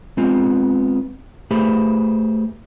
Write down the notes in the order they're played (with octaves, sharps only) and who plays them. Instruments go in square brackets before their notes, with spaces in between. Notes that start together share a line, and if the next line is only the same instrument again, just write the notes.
[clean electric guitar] G#3 B3 C4 F4
A3 G4 G#4 B4 C5 B5